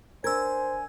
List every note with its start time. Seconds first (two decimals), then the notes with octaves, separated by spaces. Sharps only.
0.24 D4 A#4 C5 G#5 E6 G#6